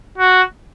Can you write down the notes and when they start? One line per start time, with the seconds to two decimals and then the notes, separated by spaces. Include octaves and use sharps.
0.18 F#4